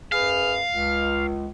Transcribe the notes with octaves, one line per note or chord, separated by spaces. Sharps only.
F#2 G#4 B4 F5
C#2